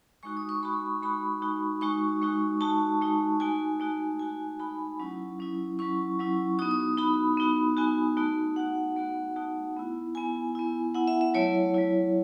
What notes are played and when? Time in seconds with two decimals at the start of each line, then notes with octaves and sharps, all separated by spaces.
0.23 G#3 D#4 F#4 C#6
0.37 D#6
0.49 C#6
0.63 G#3 D#4 F#4 B5
1.03 G#3 D#4 F#4 B5
1.42 G#3 D#4 F#4
1.81 G#3 D#4 F#4 C#6
2.21 G#3 D#4 F#4
2.61 G#3 D#4 F#4 A5
3.01 G#3 D#4 F#4
3.40 A3 D#4 F#4 G#5
3.80 A3 D#4 F#4
4.19 A3 D#4 F#4 G#5
4.60 A3 D#4 F#4 B5
4.99 F#3 C#4 E4
5.39 F#3 C#4 E4
5.79 F#3 C#4 E4 C#6
6.19 F#3 C#4 E4
6.59 B3 D#4 F#4 D#6
6.71 D#6
6.98 B3 D#4 F#4 B5
7.37 B3 D#4 F#4
7.77 B3 D#4 F#4 G#5
8.17 A3 D#4 F#4
8.56 A3 D#4 F#4 F#5
8.96 A3 D#4 F#4
9.36 A3 D#4 F#4
9.76 B3 E4
10.15 B3 E4 G#5
10.55 B3 E4
10.94 B3 E4 F#5
11.08 E5
11.21 E5
11.34 F#3 A3 E4 C#5
11.74 F#3 A3 E4